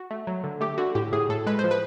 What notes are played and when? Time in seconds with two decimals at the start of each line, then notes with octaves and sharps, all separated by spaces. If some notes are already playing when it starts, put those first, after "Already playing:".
Already playing: F#4
0.11 A3
0.27 F#3
0.44 D3
0.61 A3 G4
0.78 D3 F#4
0.95 A2 G4
1.12 A2 G#4
1.29 A2 A4
1.46 G#3 B4
1.59 F3 C5
1.71 B4